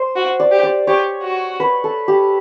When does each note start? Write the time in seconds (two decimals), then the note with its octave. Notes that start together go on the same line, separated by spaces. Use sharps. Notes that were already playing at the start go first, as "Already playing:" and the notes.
Already playing: C5
0.16 F#4
0.40 D5
0.51 G4
0.63 D5
0.87 G4 C#5
1.23 F#4
1.60 B4
1.84 A4
2.08 G4